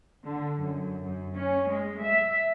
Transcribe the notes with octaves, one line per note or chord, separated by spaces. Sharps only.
D3
F#2
F#2
C#4
G#3
E5